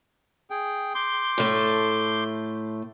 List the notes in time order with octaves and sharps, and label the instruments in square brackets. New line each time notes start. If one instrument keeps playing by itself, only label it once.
[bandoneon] G#4 G5
C6 D6 G6
[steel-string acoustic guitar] A2 A3